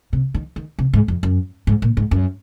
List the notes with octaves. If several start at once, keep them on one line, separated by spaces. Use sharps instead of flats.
C3
D#3
D#3
C3
G#2
F2
F#2
G#2
A#2
G#2
F#2